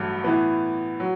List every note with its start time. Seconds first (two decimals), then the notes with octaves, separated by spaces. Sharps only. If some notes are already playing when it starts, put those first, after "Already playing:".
Already playing: A1 G2 F#3 A3
0.24 A2 E3 B3
1.00 F#3